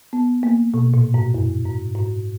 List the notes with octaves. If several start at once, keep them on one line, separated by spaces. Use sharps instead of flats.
B3
A#3
B2
A#2
G#2
F#2
G#2
G#2